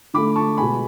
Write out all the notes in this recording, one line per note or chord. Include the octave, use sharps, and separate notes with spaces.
D3 A3 B5 D6
A5 C#6
B2 G#3 B3 G#5 B5